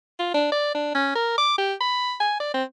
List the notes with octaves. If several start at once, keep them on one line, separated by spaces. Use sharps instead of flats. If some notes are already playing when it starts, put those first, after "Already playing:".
F4
D4
D5
D4
C#4
A#4
D6
G4
B5
G#5
D5
C4